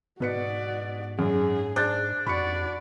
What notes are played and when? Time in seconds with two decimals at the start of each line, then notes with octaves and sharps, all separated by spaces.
0.20 G#2 B2 F#4 B4 D5 C#7
1.19 F#2 G#4
1.76 D4 C5 G6 A6
2.27 F2 F#4 D5 B5 C#6 C#7